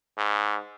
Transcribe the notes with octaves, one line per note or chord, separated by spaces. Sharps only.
G#2